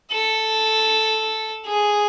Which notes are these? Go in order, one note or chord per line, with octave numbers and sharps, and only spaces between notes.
A4
G#4